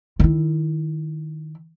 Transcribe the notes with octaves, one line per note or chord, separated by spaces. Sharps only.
D#3 E4